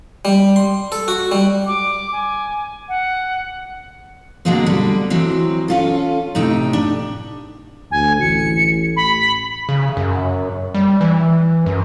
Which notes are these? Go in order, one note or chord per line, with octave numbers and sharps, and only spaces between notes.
G3
C6
A4
F#4
G3
D6
G#5
F#5
B2 D3 F#3 G#3 A#3 C4
D3 G3
E3 F#3 G#3 C4
C#4 F4 A4
A2 C3 D#4 G5
D4
D2 G#5
A1 C#7
B5
C#3
F#2
G3
E3
F#2